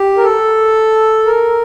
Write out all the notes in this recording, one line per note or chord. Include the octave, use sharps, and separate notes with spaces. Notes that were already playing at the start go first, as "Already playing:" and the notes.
Already playing: G4
A#4
A4
A#4